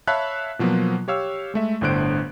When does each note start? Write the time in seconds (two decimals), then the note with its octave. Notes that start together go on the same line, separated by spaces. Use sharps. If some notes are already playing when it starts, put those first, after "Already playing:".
0.07 C#5 E5 F5 A5 B5 F#6
0.59 B2 F3 F#3 A#3 B3
1.08 G4 C#5 F5 E6
1.54 G#3 A3 E5
1.81 G1 A2 D3 C5 F#6 D7